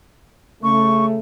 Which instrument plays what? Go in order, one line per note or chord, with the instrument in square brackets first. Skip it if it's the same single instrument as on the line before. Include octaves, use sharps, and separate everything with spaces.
[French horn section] C#3 A3 [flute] C#6